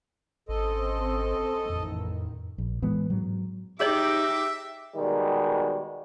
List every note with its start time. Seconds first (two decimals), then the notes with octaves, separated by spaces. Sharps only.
0.49 G#1 C4 C#4 A4 D#5
1.70 A1 F2 D#3
2.58 A#1
2.82 A2 E3 G#3 B3
3.10 G#2 F#3
3.80 D#4 G4 G#4 C#5 D#5 E5 G5 D6
4.96 B2 D#3 G3 G#3